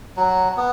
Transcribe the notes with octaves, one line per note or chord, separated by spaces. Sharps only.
F#3
B3